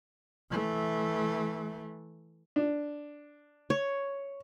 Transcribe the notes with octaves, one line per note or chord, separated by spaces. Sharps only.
E3 A3
D4
C#5